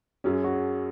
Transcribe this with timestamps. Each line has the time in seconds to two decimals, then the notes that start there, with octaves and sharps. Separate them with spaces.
0.24 F#2 F#3 C#4 G#4
0.44 F#4
0.53 G#4